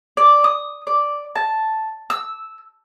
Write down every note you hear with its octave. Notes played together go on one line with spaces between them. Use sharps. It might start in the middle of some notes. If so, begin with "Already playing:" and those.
D5
D#6
D5
A5
E6